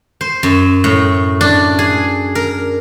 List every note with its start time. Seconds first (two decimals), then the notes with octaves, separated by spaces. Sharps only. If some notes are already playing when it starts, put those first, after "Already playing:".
0.21 C5
0.43 F#2
0.84 A2
1.41 D4
1.79 G#4
2.35 A#4